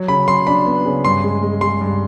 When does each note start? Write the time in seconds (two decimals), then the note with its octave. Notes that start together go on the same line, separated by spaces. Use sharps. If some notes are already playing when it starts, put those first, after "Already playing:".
Already playing: F#3
0.08 C#3 B5
0.28 F#3 C6
0.47 D4 B5
0.66 B3
0.85 C#3
1.04 G2 C6
1.24 G#3
1.43 G#3
1.61 G#3 C6
1.81 G2